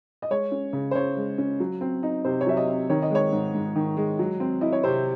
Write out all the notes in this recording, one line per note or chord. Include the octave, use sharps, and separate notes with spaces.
D#5
G#3 C#5
C#4
C#3
C5
C#3 C#5
G#3
C#4
F#3
C4
D#4
C3 C5
C#5
F#3 E5
D#5
C4
D#3 C#5
D#5
G#3 C#5
G#2
G#2
D#3
G#3
F#3
C4
E4 D#5
C#5
C3 C5